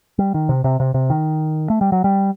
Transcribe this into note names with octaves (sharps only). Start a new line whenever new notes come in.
G3
D#3
C3
C3
C3
C3
D#3
A3
G3
F#3
G3